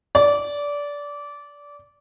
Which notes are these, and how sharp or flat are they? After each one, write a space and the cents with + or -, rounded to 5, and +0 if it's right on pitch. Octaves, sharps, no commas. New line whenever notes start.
D5 -20